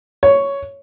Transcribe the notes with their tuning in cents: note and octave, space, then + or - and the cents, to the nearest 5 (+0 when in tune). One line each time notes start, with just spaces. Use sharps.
C#5 +5